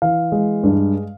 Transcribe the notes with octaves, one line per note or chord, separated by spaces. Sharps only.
E3 F5
G#3
G2